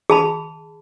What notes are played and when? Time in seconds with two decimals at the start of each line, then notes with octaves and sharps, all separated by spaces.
0.10 G#4 A5 B5